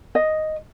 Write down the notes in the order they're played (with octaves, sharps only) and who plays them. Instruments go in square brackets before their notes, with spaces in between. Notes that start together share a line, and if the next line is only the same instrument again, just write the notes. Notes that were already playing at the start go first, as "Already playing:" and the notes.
[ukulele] D#5